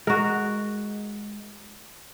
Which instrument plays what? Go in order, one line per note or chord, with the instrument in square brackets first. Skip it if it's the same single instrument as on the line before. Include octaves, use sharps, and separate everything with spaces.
[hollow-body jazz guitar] G#3 [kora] F#4 A#4